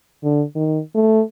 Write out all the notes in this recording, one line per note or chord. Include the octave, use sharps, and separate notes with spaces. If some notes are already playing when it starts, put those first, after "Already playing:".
D3
D#3
A3